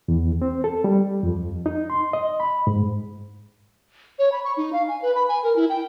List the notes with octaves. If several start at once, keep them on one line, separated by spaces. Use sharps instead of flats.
E2
C4
A4
G3
F2
D#4
C6
D#5
B5
G#2
C#5
B5
C#6
D#4
F5
G#5
B4
B5
G#5
A#4
E4
G5